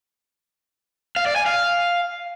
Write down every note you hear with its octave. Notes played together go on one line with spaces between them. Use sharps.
F5
D5
G#5
F5